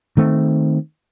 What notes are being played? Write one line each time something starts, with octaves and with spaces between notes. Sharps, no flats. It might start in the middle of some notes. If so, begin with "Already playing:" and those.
D#3 A3 C4